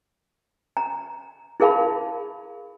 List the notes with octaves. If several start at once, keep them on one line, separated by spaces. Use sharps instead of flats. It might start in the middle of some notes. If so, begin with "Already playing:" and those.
A#5
E4 G#4 A#4 F5 A5 B5